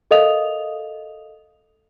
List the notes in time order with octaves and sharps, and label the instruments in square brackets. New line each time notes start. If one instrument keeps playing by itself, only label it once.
[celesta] A4 A#4 D#5 F5 D#6 F7